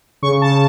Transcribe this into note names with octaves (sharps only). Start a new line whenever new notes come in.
C#3 C#6
C#3 A5